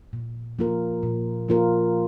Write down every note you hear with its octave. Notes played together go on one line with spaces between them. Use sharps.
A#2
F3 A#3 F4 A#4
A#2
F3 A#3 F4 A#4